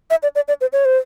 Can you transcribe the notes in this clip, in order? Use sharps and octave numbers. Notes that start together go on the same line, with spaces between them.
E5
D5
D5
D5
C5
C#5
C5